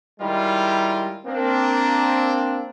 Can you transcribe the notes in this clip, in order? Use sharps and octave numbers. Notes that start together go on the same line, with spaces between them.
D#3 G3 G#3 E4 F4 A#4
A#3 C4 D4